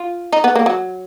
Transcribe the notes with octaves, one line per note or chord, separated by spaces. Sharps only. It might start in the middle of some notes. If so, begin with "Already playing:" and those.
Already playing: F4
D#4
B3
A#3
F#3